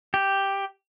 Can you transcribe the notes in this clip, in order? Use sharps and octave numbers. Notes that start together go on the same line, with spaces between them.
G4